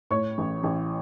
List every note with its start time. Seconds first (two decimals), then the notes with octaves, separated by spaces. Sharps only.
0.11 A2 C#5 C#6
0.38 A1
0.63 A1